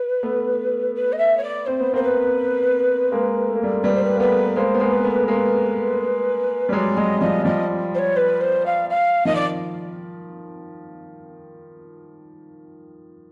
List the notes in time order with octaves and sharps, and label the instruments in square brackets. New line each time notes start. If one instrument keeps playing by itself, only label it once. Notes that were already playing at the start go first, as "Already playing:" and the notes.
Already playing: [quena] B4
[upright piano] A3 B3
[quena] B4
D#5
E5
C#5
D5
[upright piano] C4 [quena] C5
[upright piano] B3
[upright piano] A#3 C4 [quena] C5
[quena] B4
[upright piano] G#3 A#3
A3
A#3
G3 A3
[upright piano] G3 A3 [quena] B4
[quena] C5
B4
[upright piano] A#3
[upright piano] A3 B3 [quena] B4
[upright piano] G#3 A#3 [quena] C5
[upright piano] B3
G#3 A#3
[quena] B4
[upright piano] A3 B3
A3
[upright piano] G#3 A#3 [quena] B4
[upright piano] G3
[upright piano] F#3 G#3 [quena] D5
[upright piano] F#3 G#3 [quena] D#5
[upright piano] F3 G3 [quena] D#5
[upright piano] F3 G3 [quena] D#5
[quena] C5
C#5
B4
C5
F5
F5
[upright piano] D#3 F3 [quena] D#5
[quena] D5